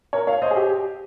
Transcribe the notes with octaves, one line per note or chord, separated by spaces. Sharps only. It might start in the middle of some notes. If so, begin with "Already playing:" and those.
A#4 C#5
C#5 F5
C5 D#5
G#4
G4